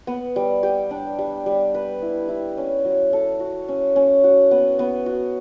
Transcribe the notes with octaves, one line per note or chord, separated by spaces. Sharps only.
B3
G3
G4
D4
G3
G3
B4
E4
E4
C#4
F#3
A4
F#4
C#4
C#4
F#4
B3
B3
F#4